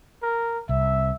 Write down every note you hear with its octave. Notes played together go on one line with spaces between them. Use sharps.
A#4
C2 E5